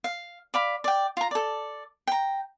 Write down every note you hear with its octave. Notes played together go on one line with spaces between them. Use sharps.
F5
D5 F5 B5
D5 G5
F4 A#5
A4 D5
G5 A#5